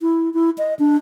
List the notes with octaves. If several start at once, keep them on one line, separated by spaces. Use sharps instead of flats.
E4
E4
D#5
D4